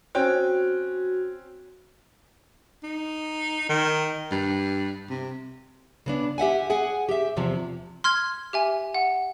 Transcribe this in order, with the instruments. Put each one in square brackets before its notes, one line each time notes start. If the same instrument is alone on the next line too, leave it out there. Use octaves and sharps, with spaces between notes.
[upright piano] C4 C#4 G5 [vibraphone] F#4
[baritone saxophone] D#4
D#3
G2
C3
[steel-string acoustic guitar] C#3 B3 D4
G4 E5 F#5 G#5
G#4 F#5 G#5
G4 E5
E2 C3 F3
[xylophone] C6 F6 G#6
G4 E5 G#5
F#5